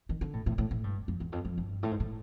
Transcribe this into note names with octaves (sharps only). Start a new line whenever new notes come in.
D#3
D3
A2
A2
A2
A2
G2
F2
E2
F2
F2
G2
A2
G#2
A2